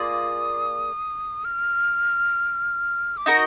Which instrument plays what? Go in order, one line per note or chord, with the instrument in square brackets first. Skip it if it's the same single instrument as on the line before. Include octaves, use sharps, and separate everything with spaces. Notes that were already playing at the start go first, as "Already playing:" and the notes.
Already playing: [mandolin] A#3 F4 G#4 D5 [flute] D#6
[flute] F6
D6
[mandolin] D#4 F#4 A#4 D#5 [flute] D#6